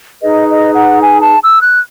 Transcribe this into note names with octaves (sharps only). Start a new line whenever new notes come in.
D#4 G#4 B4 D#5
D#5
F#5
G#5
A5
E6
F#6